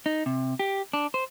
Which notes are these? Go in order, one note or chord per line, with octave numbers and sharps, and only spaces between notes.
D#4
C3
G4
D4
C5